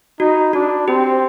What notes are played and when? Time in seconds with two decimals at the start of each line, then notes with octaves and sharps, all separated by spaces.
0.20 D#4 F#4
0.53 D4 F#4
0.88 C4 G4